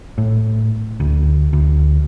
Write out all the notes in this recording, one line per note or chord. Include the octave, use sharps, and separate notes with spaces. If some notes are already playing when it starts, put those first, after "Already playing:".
A2
D2
D2